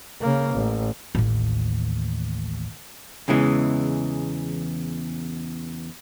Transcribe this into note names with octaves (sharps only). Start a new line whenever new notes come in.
C#3 A#3
A1
A1 D#2
E2 C#3 E3 G#3